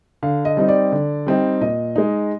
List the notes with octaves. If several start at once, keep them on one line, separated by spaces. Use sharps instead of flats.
D3 F5
D#5
G3 C4 D#4
D5
D3
G3 C4 D#4
A#2 D#5
G#3 D#4